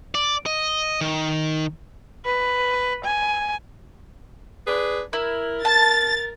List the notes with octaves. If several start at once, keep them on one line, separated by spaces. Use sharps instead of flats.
D5
D#5
D#3
B4
G#5
D4 G#4 B4
E4 A#4
A5 A6